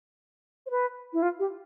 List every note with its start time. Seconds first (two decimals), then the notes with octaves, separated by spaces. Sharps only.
0.66 C5
0.70 B4
1.13 E4
1.22 F4
1.39 G4